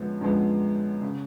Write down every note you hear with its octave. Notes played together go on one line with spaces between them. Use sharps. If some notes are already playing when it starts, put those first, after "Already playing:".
Already playing: F#2 D3 F3 G#3 B3
F#2 D3 F3 G#3 B3
C#3